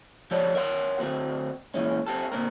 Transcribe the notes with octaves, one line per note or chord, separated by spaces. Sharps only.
F3 G4 A4 C#5 D5
A#4 C#5 F#5 C6
D2 A3 C4 F#4
A#2 E3 G#3 C#4
C4 G4 A4
A#2 D3 C4 A#4